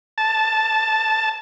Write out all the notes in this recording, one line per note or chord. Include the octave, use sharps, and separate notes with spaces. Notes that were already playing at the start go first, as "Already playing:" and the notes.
A5